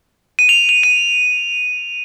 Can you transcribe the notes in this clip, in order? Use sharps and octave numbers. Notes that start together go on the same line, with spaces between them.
D#7
F7
F7
D#7